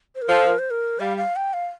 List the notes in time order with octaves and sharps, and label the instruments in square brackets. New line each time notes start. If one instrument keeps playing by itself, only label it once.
[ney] C5
A#4
[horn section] F3 [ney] A4
[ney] A#4
C5
A#4
[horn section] G3 [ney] F5
[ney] F5
G5
F5